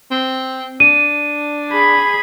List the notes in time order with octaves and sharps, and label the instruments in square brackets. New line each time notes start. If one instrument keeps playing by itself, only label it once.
[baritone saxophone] C4
[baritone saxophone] D4 [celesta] D#7
[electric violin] G#4 B5